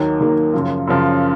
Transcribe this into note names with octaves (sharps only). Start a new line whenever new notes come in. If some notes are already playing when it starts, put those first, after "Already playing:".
Already playing: D#2 D#3 F#3 A#3
D#2 D#3 F#3 A#3
F#2 C#3 F3
F#2 C#3 F3